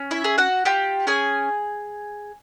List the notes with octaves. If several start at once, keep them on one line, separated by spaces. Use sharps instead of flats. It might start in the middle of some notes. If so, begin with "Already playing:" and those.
Already playing: C#4
E4 E5
G#4
F#4 F#5
F4 G4 G5
C#4 G#4 G#5